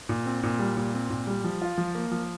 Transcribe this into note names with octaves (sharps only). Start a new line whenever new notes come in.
A#2
C4
A#2
G3
A#2
C4
A#2
G3
F3
F4
F3
A#3
F3